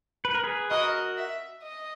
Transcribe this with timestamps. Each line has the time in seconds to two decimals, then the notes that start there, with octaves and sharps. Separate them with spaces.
0.25 B4
0.35 A#4
0.44 G#4 B4
0.70 F#4 A#4 D#5
1.17 E5
1.63 D#5